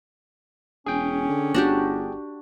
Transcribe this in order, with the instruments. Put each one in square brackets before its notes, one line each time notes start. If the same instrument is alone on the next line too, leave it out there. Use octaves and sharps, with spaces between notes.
[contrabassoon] E1 [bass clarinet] C#4 [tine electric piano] G#4 G5
[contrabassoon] D3
[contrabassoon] G1 [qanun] D4 F#4 G4